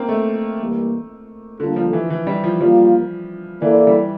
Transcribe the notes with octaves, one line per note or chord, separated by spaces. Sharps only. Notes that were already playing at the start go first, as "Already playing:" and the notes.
Already playing: A#3 C4
A3
E3 G3 A#3
D3 G3 A#3 F4 A4
F3
E3
E3
G3
F3
F3 G3 A#3 F4
E3 A#3 E4 A4 D5
G3